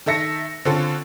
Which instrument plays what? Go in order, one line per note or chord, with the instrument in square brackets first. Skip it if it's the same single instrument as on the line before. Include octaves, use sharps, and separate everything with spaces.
[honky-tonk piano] D#3 A4 E5 A#6 C#7
D3 C4 C#4 F4 A4